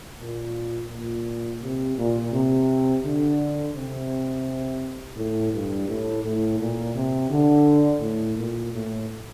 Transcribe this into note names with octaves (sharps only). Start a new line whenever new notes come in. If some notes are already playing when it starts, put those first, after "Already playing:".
A#2
A#2
C3
A#2
C3
D3
C3
A2
G2
A2
A2
A#2
C3
D3
A2
A#2
A2